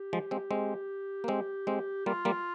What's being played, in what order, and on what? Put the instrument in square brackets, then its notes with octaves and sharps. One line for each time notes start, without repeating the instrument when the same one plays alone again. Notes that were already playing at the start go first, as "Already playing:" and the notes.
Already playing: [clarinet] G4
[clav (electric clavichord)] F3 G#3
G#3 C4
G#3 C4
A#3
G#3 C4
G#3 C4
[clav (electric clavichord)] G3 A#3 [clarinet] F4
[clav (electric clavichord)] G3 A#3